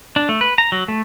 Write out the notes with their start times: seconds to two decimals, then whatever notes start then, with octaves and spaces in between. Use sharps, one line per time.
0.16 D4
0.29 A3
0.41 B4
0.58 A#5
0.72 F#3
0.88 A3